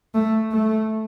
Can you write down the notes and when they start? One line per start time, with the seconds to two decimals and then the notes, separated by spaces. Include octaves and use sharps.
0.14 A3
0.52 A3